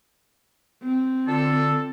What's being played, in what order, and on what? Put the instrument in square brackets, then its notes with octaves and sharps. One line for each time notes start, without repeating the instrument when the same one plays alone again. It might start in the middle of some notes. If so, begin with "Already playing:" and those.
[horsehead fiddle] C4
[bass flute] D3 [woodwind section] D4 F4 A4